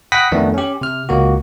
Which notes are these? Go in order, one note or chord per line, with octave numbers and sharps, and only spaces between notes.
F#5 G5 B5 D#6 A#6 B6
F2 D#3 A3 B3 D4
C#4 G4
C3 F6
C#2 A#3 F#4